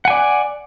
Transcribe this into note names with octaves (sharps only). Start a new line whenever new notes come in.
D5 F#5 G#5